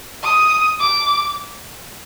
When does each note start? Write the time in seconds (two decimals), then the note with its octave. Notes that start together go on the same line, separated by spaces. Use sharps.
0.24 D#6
0.80 D6